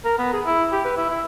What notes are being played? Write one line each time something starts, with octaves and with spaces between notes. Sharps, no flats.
A#4
B3
G#4
E4
G4
B4
E4
E4